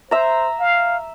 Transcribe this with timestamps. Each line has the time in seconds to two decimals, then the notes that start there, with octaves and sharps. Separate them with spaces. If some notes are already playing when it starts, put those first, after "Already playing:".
0.11 C5 E5 A#5
0.60 F5